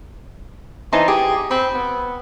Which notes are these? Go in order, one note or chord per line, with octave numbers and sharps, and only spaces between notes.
E3 D#4 C5 A5
G4 G#4
C4 B5
B3